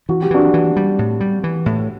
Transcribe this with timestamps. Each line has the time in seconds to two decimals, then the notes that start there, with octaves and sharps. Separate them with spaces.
0.09 E3 F#4
0.22 G4
0.31 E3 D4 F#4
0.54 E3
0.76 G3
0.99 A2
1.20 G3
1.44 E3
1.66 A2